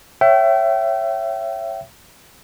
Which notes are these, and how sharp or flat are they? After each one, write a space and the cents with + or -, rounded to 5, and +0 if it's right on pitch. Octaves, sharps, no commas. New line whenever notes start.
C#5 -15 E5 +25 G5 -35